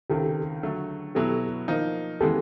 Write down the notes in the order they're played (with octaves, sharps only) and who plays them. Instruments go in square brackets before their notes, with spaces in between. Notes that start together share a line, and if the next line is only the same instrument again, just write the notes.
[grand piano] C#2 C3 D#3 [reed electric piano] G4 A4
[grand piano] D3 F#3 A3
[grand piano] B2 F#3 B3 E4 [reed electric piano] G4 A4
[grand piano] F3 A#3 D#4
[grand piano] C#3 E3 G#3 B3 [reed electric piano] G4 A4